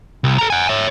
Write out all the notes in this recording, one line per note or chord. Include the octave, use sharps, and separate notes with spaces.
C2
A4 A#5
F#5 G#5
C#5 E5